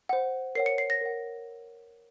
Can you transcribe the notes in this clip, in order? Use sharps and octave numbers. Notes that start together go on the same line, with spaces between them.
C5 F#5
A#4 C#5 F#5 C7
C#7
C7
A#6
A#4 C#5 F#5